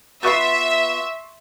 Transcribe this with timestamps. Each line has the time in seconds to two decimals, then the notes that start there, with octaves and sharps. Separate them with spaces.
0.23 B3 F4 E5 C6 C#6 A6